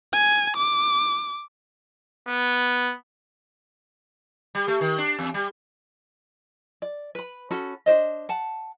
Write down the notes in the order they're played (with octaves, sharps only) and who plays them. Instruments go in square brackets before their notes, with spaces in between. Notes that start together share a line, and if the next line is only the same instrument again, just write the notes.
[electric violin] G#5
D6
[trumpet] B3
[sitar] G3
A3
D#3
D4
E2
G3
[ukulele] D5
B4 B5
C#4 F#4 A4 B5
D4 G4 C5 D#5
F#5 A5